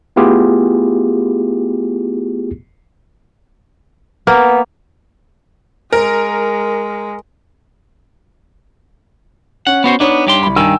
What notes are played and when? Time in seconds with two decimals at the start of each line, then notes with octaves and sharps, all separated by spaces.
0.16 A3 B3 E4 F4 G4 G#4
4.27 A#3 B3
5.93 G#3 A#4
9.67 C#4 F#5
9.84 B3 F#4 C5
10.00 B3 D4 D#4 C#5
10.27 G2 G4 C6
10.43 C2 B5
10.56 G2 D#3 G5 G#5 E6